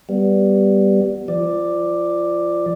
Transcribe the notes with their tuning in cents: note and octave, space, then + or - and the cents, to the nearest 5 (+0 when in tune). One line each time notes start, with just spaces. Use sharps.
G3 +0 B3 +0
F3 -25 D5 +5